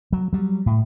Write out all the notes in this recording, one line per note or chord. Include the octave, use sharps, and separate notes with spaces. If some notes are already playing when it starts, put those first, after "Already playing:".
F#3
F#3 G3
A2